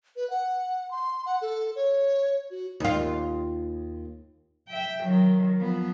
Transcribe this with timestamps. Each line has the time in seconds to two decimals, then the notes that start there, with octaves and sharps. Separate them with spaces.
0.16 B4
0.30 F#5
0.91 C6
1.26 F#5
1.41 A4
1.76 C#5
2.51 F#4
2.80 D#2 F4
4.68 E5 G5
5.04 D#3 F#3
5.58 F3 B3